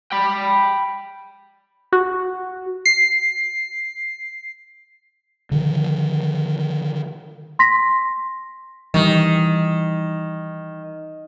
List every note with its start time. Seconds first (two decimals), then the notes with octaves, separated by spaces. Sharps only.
0.12 G5 B5
1.93 F#4
2.86 C7
5.51 D3 D#3 F3
7.59 C6 A#6 B6
8.94 D#3 E3 G3